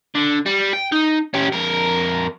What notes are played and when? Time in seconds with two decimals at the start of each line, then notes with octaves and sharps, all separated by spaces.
0.15 D3
0.46 G3
0.73 G5
0.92 D#4
1.34 C#4 G4
1.52 F2 A#4